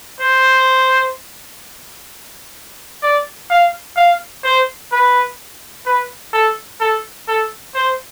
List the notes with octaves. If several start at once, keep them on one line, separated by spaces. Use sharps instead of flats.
C5
D5
F5
F5
C5
B4
B4
A4
A4
A4
C5